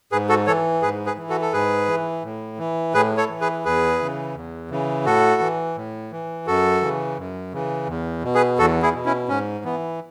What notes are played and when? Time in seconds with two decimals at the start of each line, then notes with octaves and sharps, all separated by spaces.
0.12 G#2 G#4 B4
0.29 F#4 A4
0.47 E3 A4 C#5
0.82 G#2 G#4 B4
1.06 G#4 B4
1.18 E3
1.29 F#4 A4
1.42 A4
1.53 G#2 G#4 B4
1.88 E3
2.23 A2
2.58 E3
2.94 A2 G#4 B4
3.17 A4 C#5
3.29 E3
3.41 G#4 B4
3.65 E2 G#4 B4
4.00 C#3 E3
4.35 E2
4.71 C#3 E3
5.06 A2 F#4 A4
5.41 E3
5.76 A2
6.12 E3
6.47 F#2 F#4 A4
6.82 C#3 E3
7.18 F#2
7.53 C#3 E3
7.88 E2
8.24 B2
8.35 G#4 B4
8.58 E2 F#4 A4
8.82 E4 G#4
8.94 B2
9.05 C#4 E4
9.29 G#2 C#4
9.65 E3 B3